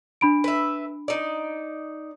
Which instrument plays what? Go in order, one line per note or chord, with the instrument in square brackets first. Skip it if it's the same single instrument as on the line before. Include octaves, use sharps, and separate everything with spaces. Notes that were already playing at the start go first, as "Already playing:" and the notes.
[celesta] D4 B5 D7
[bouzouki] B4 E5
D#4 D5